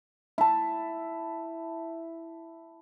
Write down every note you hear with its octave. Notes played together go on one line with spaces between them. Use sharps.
E4 A5